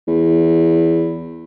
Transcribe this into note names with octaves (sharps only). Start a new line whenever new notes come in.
E2